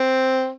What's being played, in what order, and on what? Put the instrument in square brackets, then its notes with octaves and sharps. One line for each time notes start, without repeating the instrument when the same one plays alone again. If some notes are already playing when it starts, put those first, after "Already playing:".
Already playing: [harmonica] C4